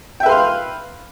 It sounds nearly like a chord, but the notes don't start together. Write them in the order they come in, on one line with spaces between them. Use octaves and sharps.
G5 E5 B4 C6 F5